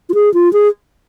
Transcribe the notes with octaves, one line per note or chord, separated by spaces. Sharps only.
F4
G#4
F4
G#4